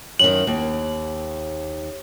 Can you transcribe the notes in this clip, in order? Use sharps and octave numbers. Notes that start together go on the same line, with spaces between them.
F#2 D#3 F#7
D#2